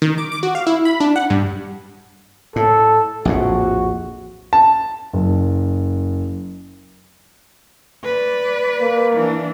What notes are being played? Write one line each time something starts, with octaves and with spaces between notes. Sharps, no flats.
D#3
D6
D6
F#4
F5
E4
B5
D4
F#5
G2
A2 A4
A#1 F2 A2 F#4
A5
F#1
B4 D5
A#3
E3 D4